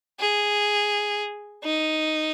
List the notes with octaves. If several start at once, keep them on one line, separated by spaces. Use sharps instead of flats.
G#4
D#4